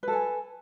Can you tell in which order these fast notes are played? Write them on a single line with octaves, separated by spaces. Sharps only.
B4 A4 G#5